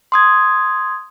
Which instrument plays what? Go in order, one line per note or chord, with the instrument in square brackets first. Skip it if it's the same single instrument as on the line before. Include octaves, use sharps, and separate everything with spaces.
[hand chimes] C6 D#6 G#6